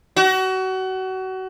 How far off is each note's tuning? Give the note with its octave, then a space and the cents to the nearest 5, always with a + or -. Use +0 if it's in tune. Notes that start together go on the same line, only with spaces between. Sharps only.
F#4 +30